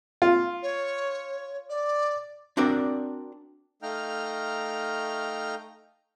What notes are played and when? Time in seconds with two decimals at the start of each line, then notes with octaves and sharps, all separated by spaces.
0.22 F4
0.62 C#5
1.69 D5
2.57 C4 D4 F#4 A#4 D5
3.82 A3 D#4 F5 G5 A#5 F6